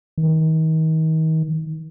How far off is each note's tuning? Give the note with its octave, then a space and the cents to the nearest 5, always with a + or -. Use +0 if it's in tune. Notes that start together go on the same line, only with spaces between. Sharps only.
D#3 +35